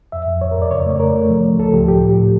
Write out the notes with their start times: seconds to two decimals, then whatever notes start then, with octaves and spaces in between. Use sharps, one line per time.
0.12 F2 E5
0.28 F2
0.41 F2 C#5
0.51 A#4
0.57 F2
0.62 D5
0.71 C#3 C#5
0.80 D5
0.86 A3 C#5
1.00 A3 A#4
1.15 A3
1.30 F3
1.45 C#3
1.58 C#2 A4
1.74 F3 G4
1.88 A2 G4
2.02 A2
2.18 A2